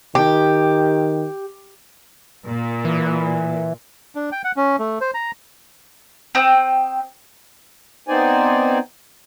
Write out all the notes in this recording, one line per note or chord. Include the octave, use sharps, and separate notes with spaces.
D#3 G4
A#2
E3
D4
G5
F#5
C#4
A3
C5
A#5
C4 G5 D#6
B3 C4 D#4 C5 D5 G#5